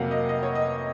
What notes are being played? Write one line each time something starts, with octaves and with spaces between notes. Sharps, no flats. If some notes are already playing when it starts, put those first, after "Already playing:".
Already playing: F2 C3 F#3 A#3 F5 F#5
D#5
D#5
C#5
D#5